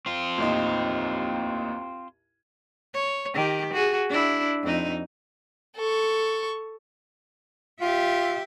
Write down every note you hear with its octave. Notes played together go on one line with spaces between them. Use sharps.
C4 F4
A1 D#2 D#4
C#5
D#3 G4
F#4 G#4
D4 E4
F2 D#4
A4 C#6
F4 G4 E5